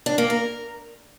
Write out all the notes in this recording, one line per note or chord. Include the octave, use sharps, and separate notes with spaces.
D4
A#3
A#4